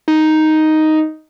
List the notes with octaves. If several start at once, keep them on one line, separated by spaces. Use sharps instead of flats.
D#4